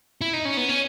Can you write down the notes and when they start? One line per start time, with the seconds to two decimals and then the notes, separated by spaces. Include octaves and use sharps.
0.21 E4
0.33 D#4
0.45 C#4
0.57 B3
0.69 C#4